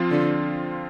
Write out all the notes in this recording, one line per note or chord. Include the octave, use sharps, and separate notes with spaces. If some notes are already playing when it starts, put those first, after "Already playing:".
Already playing: F3 C4 F4
D3